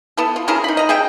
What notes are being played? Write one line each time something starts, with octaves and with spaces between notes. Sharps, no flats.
B3 E4 A4
F4
C#4 E4 G#4 A#4
D#4 B5
D#5 A#5
G#4 D#5 E5 G5